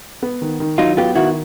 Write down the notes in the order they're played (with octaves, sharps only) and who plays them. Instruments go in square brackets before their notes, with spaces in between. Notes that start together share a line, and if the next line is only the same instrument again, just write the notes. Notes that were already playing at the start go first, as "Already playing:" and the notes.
[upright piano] B3
D#3
D#3
[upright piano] F#3 [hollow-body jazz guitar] D#4 F4
[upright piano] B3 [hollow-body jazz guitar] F4 G4
[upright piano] D#3 [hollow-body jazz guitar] E4 F#4